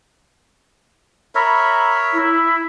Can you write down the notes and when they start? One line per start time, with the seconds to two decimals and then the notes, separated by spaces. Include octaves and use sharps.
1.35 A#4 C#5 E5 B5
2.13 E4